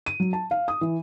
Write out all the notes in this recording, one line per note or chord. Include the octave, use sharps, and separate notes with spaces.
D#7
F#3
A5
F5
D#6
E3